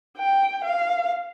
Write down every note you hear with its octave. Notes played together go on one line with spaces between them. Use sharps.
G5
F5